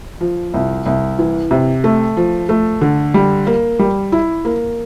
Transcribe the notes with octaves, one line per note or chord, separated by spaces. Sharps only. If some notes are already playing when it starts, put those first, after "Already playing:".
F3
C2
C2
E3
C3
A3
F3
A3
D3
G3
A#3
G3
E4
A#3